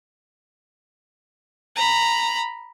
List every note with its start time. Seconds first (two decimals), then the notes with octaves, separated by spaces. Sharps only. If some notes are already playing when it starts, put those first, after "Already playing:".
1.76 A#5 B5